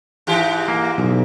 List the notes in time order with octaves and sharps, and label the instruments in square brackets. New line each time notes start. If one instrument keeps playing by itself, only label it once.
[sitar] G#2 E3 G4
[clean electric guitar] A#3
B1